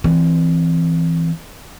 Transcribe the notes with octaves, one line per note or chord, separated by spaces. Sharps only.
E3 C4